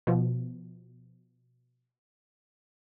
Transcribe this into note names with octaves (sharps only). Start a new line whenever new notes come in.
B2 F3